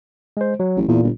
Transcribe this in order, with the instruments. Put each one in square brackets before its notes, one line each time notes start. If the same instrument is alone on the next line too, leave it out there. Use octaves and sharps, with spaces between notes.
[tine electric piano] G#3 C5
F#3
[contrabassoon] A1
[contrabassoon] E2 [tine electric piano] A#2
[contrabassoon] G1